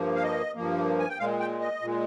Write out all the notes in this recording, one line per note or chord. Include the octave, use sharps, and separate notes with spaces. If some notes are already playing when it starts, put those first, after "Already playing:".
Already playing: G2 F3 A#3
F5
D#5
G2 F3 A#3
G#5
G5
A#2 G#3 F5
G5
D#5
A#2 G#3